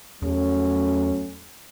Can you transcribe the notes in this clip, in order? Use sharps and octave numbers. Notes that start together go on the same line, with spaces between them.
E2 F#3 A3 C#4